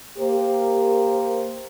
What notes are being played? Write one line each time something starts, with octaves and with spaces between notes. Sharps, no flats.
A#3 G4 A#4 C5